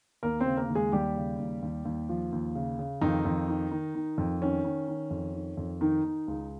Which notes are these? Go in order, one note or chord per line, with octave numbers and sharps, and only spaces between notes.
D#2 A#3 A#4
C4 C5
C#3
A#3 A#4
D#2
G#3 G#4
D#2 G3 G4
C#3
D#2
D#2
D#2
F3
D#2
C#3
C#3
F2 D#3 D#4
F2
D#3
D#3
D#3
F2
D#3 C#4
D#3
D#3
F2
D#3
F2
D#3 D#4
D#3
C#2